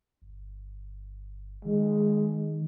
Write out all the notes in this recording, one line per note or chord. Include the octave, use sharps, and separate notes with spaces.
G1
D#3 G#3